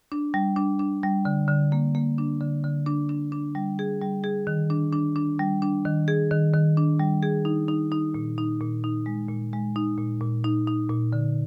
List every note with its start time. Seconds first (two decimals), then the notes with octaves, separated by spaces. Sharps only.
0.12 D4
0.34 G3
0.56 D4
0.79 D4
1.03 G3
1.25 D3
1.48 D3
1.72 A#3
1.95 A#3
2.18 D4
2.41 D3
2.64 D3
2.86 D4
3.09 D4
3.32 D4
3.55 G3
3.79 G#4
4.01 G3
4.24 G#4
4.47 D#3
4.70 D4
4.93 D4
5.16 D4
5.39 G3
5.62 D4
5.85 D#3
6.08 G#4
6.31 D#3
6.53 D#3
6.77 D4
6.99 G3
7.23 G#4
7.45 D#4
7.68 D#4
7.92 D#4
8.14 A#2
8.38 D#4
8.61 A#2
8.84 D#4
9.06 G#3
9.29 A#2
9.53 G#3
9.76 D#4
9.98 A#2
10.21 A#2
10.44 D#4
10.68 D#4
10.90 A#2
11.13 D3